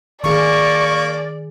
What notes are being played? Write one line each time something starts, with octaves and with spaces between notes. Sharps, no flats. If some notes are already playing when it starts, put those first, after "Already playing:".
D#3 A#3 G#4 D5 C#6